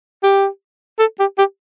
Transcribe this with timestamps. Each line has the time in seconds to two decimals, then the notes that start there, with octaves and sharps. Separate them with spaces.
0.23 G4
0.99 A4
1.20 G4
1.38 G4